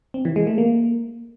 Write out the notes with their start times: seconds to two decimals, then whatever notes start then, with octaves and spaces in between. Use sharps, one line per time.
0.14 C4
0.25 E3
0.36 G#3
0.47 A3
0.58 A#3